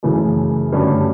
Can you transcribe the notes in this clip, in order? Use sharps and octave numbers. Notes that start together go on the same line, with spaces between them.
F#2 C#3 E3 A3
G2 D3 F#3 A3 C#4